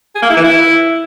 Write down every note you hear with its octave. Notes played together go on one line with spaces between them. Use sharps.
G#4
A#3
E4
E3
E4